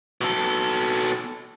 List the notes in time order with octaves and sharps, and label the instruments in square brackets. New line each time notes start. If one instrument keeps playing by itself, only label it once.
[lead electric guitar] B2 A4